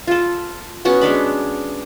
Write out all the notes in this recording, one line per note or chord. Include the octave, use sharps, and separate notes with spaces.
F4 A4
B3 C#4 F#4
G#3 C#4 D4 B5